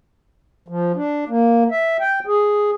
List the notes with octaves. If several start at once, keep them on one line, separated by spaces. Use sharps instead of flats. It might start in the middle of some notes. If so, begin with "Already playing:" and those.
F3
D4
A#3
E5
G5
G#4